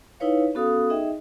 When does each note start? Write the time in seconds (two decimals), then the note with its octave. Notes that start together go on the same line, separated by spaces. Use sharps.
0.20 D#4 E4 B4 C#5 F5
0.55 B3 C#4 F#4 A4 F5 D#6
0.90 D#4 G#4 D#5 E5 G5